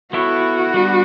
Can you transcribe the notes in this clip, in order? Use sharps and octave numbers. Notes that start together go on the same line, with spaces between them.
B3 E4 F#4 A4 C#5
G3 B3 D4